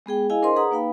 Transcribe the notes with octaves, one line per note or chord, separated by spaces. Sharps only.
G#3 B3 G#4 G5
E4 G#4 D#5 F5 G#5
D4 A#4 C5 D#5 C6
G#4 B4 F#5 A#5 D#6
A#3 D#4 B4 F5 G5 B5